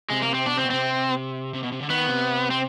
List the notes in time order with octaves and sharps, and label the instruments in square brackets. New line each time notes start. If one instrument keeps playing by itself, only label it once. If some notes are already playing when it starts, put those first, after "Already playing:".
[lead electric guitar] C3 [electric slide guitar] G#3
[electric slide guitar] A#3
[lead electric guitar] C3
[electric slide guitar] C4
[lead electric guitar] B2 [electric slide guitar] D4
[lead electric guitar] C3 [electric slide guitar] C4
[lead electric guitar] B2
[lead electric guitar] C3 [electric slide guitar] C4
[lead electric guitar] C3
B2
C3
D3
[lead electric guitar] D#3 [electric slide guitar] B3
[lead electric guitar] C3
[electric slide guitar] C4